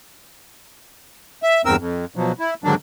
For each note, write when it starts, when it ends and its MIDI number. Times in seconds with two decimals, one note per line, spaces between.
1.43 1.62 76
1.65 1.76 40
1.65 1.76 43
1.65 1.76 60
1.65 1.76 70
1.65 1.76 88
1.78 2.05 41
2.16 2.32 47
2.16 2.32 53
2.16 2.32 54
2.39 2.54 64
2.64 2.75 44
2.64 2.75 50
2.64 2.75 51
2.64 2.75 54
2.64 2.75 62